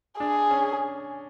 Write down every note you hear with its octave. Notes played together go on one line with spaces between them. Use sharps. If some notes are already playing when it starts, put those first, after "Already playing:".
D4 G#4
C#4